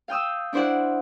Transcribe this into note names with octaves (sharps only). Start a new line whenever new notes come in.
F5 G5 D#6 E6
D4 E4 C5 D5 F#5